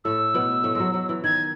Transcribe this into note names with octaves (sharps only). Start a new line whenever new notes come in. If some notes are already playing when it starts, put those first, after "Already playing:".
A2 A3 E6
B2 B3
A2 A3
F#3 G#3
F#3
E3
D#3 G#6